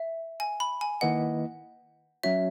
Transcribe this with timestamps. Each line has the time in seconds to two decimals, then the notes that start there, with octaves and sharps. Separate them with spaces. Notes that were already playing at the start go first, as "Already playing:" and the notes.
Already playing: E5
0.40 G#5
0.60 B5
0.81 G#5
1.01 D#3 A#3 E4 B4 D#5 F#5
2.23 F#3 C#4 F#4 C#5 E5